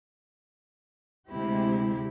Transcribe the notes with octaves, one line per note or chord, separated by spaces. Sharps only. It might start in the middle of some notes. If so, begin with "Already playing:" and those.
D2 C3 G#3 C4 E4 G4